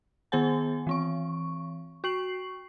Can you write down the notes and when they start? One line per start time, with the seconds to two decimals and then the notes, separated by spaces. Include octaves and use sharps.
0.32 D#3 B3 G#4 C5 F#5 G#5
0.87 E3 C4 C#6
2.04 F#4 C#6 C7 F#7